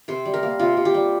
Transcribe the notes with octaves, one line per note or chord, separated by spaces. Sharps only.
C3 C5
G3
A#4
A#3
C3 F4
C3
G4
G3